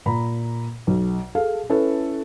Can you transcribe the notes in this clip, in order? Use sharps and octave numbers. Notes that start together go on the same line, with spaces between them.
A#2 A#5 B5
B1
G#4 A4 F5
C#4 E4 A4 B4